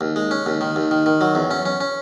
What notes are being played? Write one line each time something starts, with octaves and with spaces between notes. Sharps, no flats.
D#2
G#3
C#4
D#2
D#3
D#2
D#3
D#3
F#3
E2
C#4
C#4
C#4